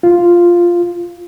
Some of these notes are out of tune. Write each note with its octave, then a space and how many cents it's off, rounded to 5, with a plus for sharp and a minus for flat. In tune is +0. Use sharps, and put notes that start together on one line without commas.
F4 +0